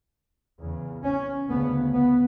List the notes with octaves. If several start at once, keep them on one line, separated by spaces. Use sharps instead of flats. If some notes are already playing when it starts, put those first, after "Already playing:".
E2 C#3
C#4
D2 C#3 B3
B3